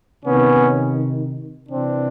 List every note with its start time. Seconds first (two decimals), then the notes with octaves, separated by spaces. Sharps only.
0.23 C3 D#3 B3 C#4
1.69 C3 E3 C4 D4